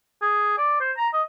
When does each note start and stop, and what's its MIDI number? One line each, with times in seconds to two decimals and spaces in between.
0.22 0.55 68
0.58 0.76 74
0.80 0.92 72
0.98 1.08 82
1.13 1.23 75